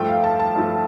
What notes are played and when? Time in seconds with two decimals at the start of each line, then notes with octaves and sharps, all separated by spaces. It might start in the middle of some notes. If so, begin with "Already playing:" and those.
Already playing: G2 F3 A3 G5
0.09 F5
0.24 A5
0.40 A5
0.56 G2 F3 A3